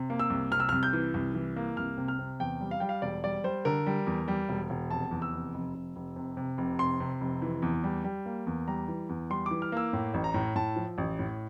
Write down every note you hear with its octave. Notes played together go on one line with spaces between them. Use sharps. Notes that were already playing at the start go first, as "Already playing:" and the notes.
Already playing: C3
A#3
E6
C2
C3 F6
E6
C2 F6
G6
E3
C2
E3
A#3
C2 F6
C3
F6
C3
E2 G5
G3
F5
G3 G5
F5
E1 D5
G3 D5
G3 C5
D3 A#4
G3
E2
G3
E1
E1
F1 A5
E2
E6
F1
F1
F1
F1
C3
C3
F1
C3 C6
C3
F1
E3
E2
G3
G3
A#3
E2
G3 A#5
E3
E2
G3 C6
E3 D6
F6
A#3 E6
A2
A1
A#5
A2
A2 A5
F3
A1
A2